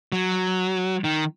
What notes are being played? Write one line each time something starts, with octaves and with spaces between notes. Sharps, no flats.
F#3
D#3